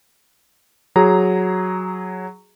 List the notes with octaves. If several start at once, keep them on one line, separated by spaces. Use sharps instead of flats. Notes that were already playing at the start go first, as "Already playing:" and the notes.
F#3 G#4 A#5